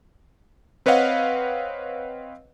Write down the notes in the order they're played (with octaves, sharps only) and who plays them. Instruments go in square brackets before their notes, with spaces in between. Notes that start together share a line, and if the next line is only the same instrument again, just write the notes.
[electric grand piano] C4 B4 C#5 D#5 F5 F#5